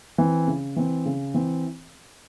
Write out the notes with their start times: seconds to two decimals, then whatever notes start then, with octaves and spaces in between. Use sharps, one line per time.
0.18 E3 C4
0.48 C#3
0.76 E3 C4
1.06 C#3
1.34 E3 C4